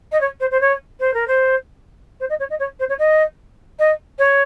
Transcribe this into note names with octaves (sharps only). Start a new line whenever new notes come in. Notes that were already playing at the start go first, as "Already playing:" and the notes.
D#5
C#5
C5
C5
C#5
C5
A#4
C5
C5
D#5
C#5
D#5
C#5
C5
C#5
D#5
D#5
C#5